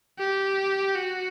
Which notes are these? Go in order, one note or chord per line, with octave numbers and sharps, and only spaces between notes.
G4
F#4